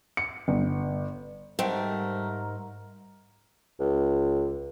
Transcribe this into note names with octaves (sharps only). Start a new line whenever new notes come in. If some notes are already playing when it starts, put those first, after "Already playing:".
C#7
G1
G#2 G3 A3 C4 A#4
C#2